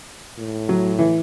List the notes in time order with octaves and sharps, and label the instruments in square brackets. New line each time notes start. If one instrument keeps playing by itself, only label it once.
[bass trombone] A2
[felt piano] F#3
E3